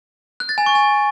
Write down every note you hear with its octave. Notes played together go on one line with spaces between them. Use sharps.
F#6
A6
G#5
C#6
G#5